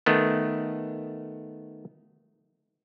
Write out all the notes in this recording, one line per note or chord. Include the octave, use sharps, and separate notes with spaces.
D#3 A3 B3